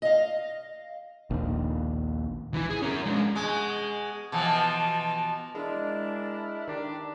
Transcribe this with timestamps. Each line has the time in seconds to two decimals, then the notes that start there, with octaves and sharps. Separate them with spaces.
0.02 D#5 F5
1.31 A#1 D#2
2.54 E3 E4
2.70 G#4
2.82 C#4 A#4
3.06 G#3 D4
3.35 B2 G#3
4.32 B2 E3 F3
5.55 G#3 D4 E4 A#4
6.68 D#3 D4 G4